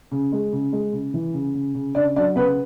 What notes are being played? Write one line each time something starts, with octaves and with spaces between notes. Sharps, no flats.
C#3
G#3
C#3
G#3
C#3
E3
C#3
C#3
C#3
C#3 D4 D5
F#3 D4 D5
C#3 B3 B4